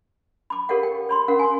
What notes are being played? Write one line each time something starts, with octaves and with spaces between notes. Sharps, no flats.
B5 D6
G4 A4 A#4 C#5 F5 F#5
G5
C#5 B5 C6
C#4 A#4 F5 F#5
G#5 C6